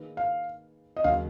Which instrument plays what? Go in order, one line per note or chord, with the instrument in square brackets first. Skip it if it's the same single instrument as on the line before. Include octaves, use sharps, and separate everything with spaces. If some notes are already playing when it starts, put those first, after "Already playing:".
Already playing: [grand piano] D#3 A#3 D#4 G#4 B4
[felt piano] F5
D#5
[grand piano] D#2 C#3 F#3 [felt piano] F5